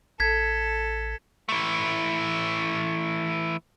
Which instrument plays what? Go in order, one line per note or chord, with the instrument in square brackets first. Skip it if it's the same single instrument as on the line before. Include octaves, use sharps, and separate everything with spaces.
[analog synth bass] A1 [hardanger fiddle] A4 [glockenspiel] G#6 B6
[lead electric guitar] E3 A3